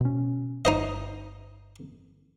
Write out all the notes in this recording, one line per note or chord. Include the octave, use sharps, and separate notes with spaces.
B2 C#4
G1 D#4 C5 D#5